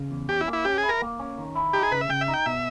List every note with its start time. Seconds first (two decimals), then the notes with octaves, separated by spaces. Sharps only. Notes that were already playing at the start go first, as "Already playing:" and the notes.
Already playing: C#3
0.11 E2
0.29 C#4 G4
0.41 E4
0.48 A#3
0.53 E4
0.65 C#4 G4
0.78 G#4
0.83 E4
0.89 A#4
1.02 A#3
1.20 C#4
1.38 D#3
1.55 E4
1.73 D#4 G4
1.83 G#4
1.92 C#3 B4
2.01 E5
2.09 C#3 G5
2.21 E5
2.28 D#4
2.34 G5
2.46 B2 E5